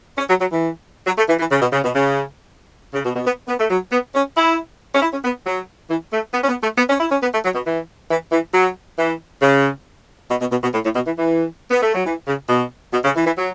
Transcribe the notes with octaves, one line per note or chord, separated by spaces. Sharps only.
C#4
F#3
F#3
E3
F#3
A3
E3
E3
C#3
B2
C#3
B2
C#3
C#3
B2
B2
B3
B3
A3
F#3
B3
C#4
E4
C#4
E4
C#4
B3
F#3
E3
A3
B3
C#4
B3
A3
B3
C#4
E4
C#4
B3
A3
F#3
B2
E3
E3
E3
F#3
E3
C#3
B2
B2
B2
B2
A2
A2
B2
E3
E3
B3
A3
F#3
E3
C#3
B2
B2
C#3
E3
E3
F#3